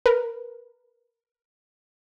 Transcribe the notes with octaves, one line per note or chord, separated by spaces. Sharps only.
A#4 B4